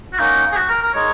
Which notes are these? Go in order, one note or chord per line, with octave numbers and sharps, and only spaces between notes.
F#4
A#3 C#4 D#4 A#4 F#5
G#4
F#4
A#4
A#4
G#3 D#4 A#4 C#5